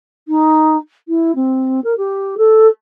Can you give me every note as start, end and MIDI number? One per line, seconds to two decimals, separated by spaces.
0.28 0.76 63
1.08 1.32 64
1.35 1.80 60
1.84 1.93 70
1.97 2.35 67
2.37 2.67 69